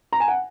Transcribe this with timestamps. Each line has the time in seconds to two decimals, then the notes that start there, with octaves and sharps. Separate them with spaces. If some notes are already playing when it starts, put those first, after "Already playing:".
0.13 A#5
0.20 G#5
0.28 F#5